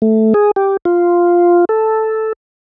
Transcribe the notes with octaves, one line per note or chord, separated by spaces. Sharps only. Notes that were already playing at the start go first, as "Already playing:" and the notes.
A3
G#4
G4
F4
A4